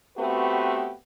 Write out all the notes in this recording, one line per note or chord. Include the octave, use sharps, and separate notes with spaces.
A3 B3 C4 F#4 G4 B4